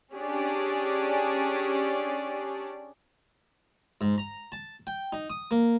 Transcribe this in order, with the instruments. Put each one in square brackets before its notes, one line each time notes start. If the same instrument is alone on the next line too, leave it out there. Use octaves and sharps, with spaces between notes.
[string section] C#4 D4 G4 G#4 D5
[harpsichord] G#2
A#5
A5
G5
D#4
D#6
A#3